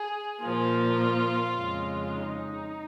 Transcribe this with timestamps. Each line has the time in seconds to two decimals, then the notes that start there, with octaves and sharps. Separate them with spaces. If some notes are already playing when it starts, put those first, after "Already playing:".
Already playing: G#4
0.42 A#2 F3 A#3 F4
1.56 F2 C#3 G#3
2.13 D#4